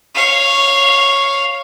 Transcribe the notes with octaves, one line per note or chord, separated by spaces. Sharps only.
C#5 F5